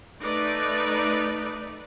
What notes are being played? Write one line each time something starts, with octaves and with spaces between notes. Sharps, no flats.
A3 D#4 B4 D5